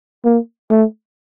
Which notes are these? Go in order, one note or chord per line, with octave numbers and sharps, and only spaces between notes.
A#3
A3